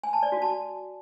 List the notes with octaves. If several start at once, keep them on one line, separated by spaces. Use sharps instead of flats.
G#5
A5
D5
F#4
A5